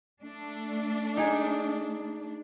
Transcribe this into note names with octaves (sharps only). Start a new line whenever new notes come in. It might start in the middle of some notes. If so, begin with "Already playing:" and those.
A3 D4
D#4 G#4